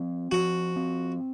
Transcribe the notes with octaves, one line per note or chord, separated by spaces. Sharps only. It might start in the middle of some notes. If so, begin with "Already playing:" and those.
Already playing: F3 C4
F3 F#4
C4